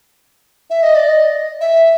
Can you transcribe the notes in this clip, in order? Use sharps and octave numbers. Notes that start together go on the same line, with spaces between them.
E5
D#5
D5
D#5
E5